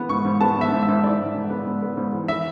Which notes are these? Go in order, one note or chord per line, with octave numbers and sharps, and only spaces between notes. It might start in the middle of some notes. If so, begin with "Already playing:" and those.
Already playing: E3 B3
G#2 C#6
G#2
B3 A5
G#2 E5
G#2
E5
G#2
G#2 D5
G#2
G#2
B3
G#2
B3
G#2
E3
E5